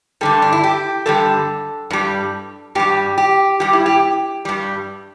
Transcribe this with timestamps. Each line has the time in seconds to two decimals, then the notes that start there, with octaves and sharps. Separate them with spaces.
0.21 G2 D3 G3 A4
0.42 D4
0.53 E4
0.64 G4
1.06 G2 D3 G3 A4
1.90 G2 G3
2.75 G2 G3 G4
3.18 G4
3.60 G2 G3 G4
3.73 E4
3.86 G4
4.45 G2 G3